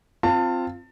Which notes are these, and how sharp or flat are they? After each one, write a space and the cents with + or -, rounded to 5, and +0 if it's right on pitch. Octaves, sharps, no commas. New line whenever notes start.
C4 +0 F4 +0 A5 +30